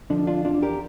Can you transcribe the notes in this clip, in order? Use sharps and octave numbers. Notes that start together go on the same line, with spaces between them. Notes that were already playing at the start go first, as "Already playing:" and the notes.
D3 F3 D4
D4 F4
E2 D4 F4
G4 A#4